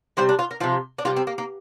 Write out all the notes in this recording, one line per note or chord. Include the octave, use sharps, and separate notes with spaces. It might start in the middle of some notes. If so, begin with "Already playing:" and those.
C3 G3 C5
D4
F4
A#4
C3 F3 F4
D4
C3 G3 F4
C4
A#3
A#3